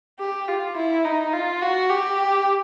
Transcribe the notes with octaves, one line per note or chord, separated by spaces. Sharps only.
G4
F4
E4
D#4
F4
F#4
G4